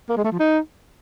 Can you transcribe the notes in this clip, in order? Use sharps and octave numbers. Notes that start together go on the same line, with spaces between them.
A#3
G#3
A3
F3
D#4